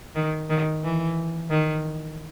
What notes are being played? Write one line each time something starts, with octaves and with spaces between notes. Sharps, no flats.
D#3
D#3
E3
D#3